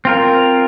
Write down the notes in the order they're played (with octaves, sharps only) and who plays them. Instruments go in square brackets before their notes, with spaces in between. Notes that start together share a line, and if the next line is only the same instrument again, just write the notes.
[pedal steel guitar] C4 F4 A#4